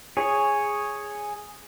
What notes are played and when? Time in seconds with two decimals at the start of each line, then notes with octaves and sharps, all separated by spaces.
0.17 G#4 C#5